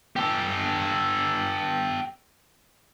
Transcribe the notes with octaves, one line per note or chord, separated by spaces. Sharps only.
G4 A4